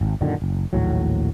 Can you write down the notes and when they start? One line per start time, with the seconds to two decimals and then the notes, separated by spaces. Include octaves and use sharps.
0.01 G#1
0.21 F#2 A#2 D3 D#3
0.42 F#1
0.73 A#1 D#2 A2 F#3